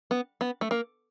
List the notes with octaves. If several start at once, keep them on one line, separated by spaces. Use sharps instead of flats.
B3
B3
A3
A#3